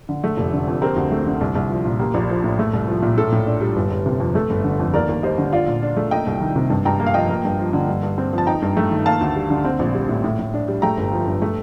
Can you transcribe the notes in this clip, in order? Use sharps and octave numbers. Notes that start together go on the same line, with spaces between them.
D3
A3
F1
D3
F2
C4 G4 A#4
D2
A3
D3
C2
C2
F3
A#2
A#3 G4
A#1
F3
A2
A3
C2
F3
A#2
A2 A4
A2
D4
G3
G1
G1
C3
F2
A3 A4
G1
D3
F2
D#2 A#4 D5
D#2
G3 C5 D#5
D3
F4 D5 F5
A#2
D4
A3
A#3 D#5 G5
C2
D#3
C3
G2
G2 G5 A#5
A#3
F5
F3 D#5 G5
A#3
G2
F3
D3
G2
G2
C4
F3
A5
D#4 G5 A#5
G2
A3
D#3
A#3 F5 A5
D2
G3
D3
C4
A#1
G3
A2
A2
A2
D4
G3
A3 G5 A#5
G1
F3
G2
A3